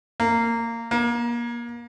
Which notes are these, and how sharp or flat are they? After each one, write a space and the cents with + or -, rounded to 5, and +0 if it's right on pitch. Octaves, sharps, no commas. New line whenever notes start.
A#3 -15
A#3 +30